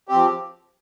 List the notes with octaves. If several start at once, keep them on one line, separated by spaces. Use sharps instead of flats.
F3 C4 G4